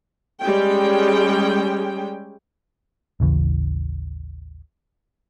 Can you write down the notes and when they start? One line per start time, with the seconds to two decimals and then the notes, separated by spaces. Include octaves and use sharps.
0.41 G3 G#3 C#4 G5
3.20 A1 D#2 C#3 E3